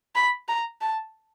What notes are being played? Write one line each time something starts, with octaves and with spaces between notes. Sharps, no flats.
B5
A#5
A5